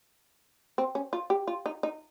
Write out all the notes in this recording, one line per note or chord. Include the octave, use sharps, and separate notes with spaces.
C4
C#4
F4
G4
F4
D#4
D#4